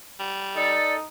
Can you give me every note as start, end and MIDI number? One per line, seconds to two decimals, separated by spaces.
0.20 0.74 55
0.56 1.07 63
0.56 0.94 69
0.56 0.94 74